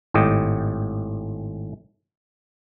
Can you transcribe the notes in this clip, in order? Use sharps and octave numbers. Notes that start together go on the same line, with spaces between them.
G#1 A2 G4 D#5